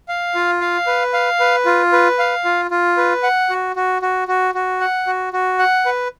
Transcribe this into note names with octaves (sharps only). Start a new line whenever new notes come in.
F5
F4
F5
B4
F5
B4
F4
B4
F5
F4
F4
B4
F#5
F#4
F#4
F#4
F#4
F#4
F#5
F#4
F#4
F#5
B4